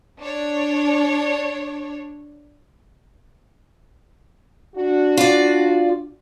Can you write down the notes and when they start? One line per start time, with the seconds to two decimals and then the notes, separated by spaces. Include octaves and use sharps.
0.19 D4 C#5
4.76 D4 F#4
5.17 F4 D5